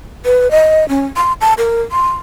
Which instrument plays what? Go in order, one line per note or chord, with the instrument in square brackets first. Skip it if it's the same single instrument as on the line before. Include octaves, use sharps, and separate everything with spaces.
[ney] B4
D#5
C#4
C6
A5
A#4
C6